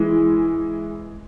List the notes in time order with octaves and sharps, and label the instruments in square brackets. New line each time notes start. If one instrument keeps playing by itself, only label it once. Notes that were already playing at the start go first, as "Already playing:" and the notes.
Already playing: [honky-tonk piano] E3 G#3